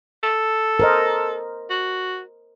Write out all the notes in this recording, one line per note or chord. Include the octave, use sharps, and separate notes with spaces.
A4
A#4 C5 D#5
F#4